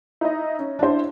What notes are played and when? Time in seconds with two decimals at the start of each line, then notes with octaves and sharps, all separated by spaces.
0.21 D#4 E4 D#5
0.59 C#4
0.79 D4 E4 C5